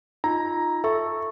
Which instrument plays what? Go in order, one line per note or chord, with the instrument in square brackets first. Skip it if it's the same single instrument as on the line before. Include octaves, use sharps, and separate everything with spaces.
[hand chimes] D#4 F4 [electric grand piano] A#5
[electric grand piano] A4 [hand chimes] E5 C#6